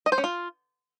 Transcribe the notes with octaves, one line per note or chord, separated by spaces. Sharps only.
D#5
C5
C#4
F4